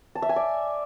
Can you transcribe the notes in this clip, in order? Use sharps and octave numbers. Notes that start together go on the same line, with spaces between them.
A5
E5
G#5
D5